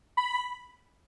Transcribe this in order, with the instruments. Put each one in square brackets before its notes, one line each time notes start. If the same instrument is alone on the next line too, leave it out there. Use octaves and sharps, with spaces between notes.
[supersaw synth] B5